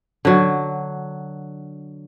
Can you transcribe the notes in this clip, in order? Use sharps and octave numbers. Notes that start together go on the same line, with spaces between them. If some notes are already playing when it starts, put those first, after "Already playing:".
D3 F#3